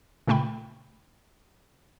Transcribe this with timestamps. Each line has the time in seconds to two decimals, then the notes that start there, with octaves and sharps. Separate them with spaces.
0.28 A#2 C#3 A3 G5 B5